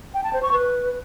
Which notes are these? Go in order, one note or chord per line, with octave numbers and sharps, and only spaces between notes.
G5
A5
C5
C#6
B4